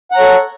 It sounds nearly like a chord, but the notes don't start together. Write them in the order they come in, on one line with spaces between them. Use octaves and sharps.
F#5 A#5 C#5 A4